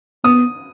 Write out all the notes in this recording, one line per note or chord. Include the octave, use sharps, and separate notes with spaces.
B3 D#6